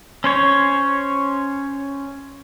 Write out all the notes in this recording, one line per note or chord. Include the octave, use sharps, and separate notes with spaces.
C#4 C5 C#5